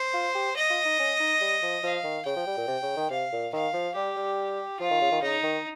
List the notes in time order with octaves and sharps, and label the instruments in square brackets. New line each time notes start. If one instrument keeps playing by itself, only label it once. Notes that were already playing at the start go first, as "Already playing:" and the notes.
Already playing: [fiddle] C5
[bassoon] F4
G4
[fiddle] D#5
[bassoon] F4
D#4
C#4
D#4
G3
F3
[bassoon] F3 [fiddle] F5
[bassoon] D#3
[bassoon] C#3 [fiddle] G5
[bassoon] F3
G3
A#2
C3
C#3
D#3
[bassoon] C3 [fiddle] F5
[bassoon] A#2
[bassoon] D#3 [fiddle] F5
[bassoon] F3
[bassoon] G3 [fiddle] G4
[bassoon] G3
[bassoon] F3 [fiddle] F4
[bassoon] D#3
C#3
D#3
[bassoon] C#3 [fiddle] D#4
[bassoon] D#3